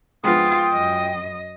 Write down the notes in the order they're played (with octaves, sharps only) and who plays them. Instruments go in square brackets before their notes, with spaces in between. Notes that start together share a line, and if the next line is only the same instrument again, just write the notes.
[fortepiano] G#2 F3 B3 [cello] F4 [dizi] G5 [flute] D#6
[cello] F#2 D#5